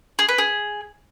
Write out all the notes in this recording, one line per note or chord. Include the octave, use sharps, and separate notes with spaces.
G#4
B4
G#4